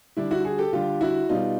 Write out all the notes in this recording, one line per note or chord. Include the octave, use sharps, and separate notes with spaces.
D3 G3 D4 E4
E4 F#4
F#4 G#4
G4 A4
D3 G3 F4 G4
E4 F#4
B2 G3 D#4 F4